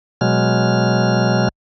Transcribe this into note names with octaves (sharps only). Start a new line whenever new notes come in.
B2 F#3 G#3 F6